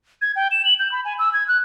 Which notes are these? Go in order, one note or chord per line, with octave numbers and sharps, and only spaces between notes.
G#6
G5
E7
F#7
G6
B5
G#5
E6
G#6
F#6